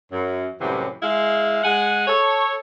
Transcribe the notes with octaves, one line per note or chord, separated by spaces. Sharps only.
F#2
F#2 A2 C3 E3 F#3 G3
G#3 E4 F5
G#3 F#5 G#5
A4 C#5